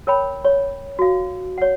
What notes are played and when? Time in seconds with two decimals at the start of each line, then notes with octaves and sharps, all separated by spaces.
0.07 A#4 C#5 G5 B5
0.44 C#5
0.99 F#4 F5
1.58 C#5 F#5